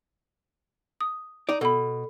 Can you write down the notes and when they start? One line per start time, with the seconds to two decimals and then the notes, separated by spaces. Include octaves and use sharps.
1.01 D#6
1.49 D#4 D5
1.61 B2 A4 B5